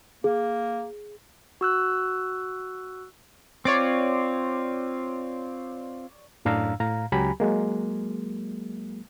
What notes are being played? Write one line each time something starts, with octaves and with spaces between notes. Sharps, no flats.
A#3 G#4
F#4 E6 F#6
C4 F4 C#5 D5 D6
F#2 A2 D4 F5 A#5 E6
A2 F5 A#5
C#2 F#3 G4 G#5 A#5 B5
F#3 G#3 A#3